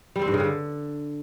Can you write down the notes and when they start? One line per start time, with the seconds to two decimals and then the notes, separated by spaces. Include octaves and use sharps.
0.16 G3
0.22 C4
0.28 G2
0.34 C#3
0.40 D3